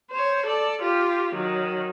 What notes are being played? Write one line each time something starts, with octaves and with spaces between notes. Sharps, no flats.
C5 C#5
A4 D5
F4 G4
D#3 F#3